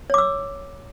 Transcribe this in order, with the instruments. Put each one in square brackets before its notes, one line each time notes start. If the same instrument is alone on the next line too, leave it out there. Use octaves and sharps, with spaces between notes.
[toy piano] C#5
D6
E6